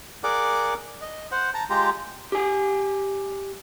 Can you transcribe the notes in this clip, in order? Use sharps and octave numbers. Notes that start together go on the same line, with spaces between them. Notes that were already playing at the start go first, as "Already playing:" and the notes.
G#4 A#4 D5 F#5 D6
D#5
C5 F#5
A5 A#5
G#3 F4 G4 A#5
G4 G#5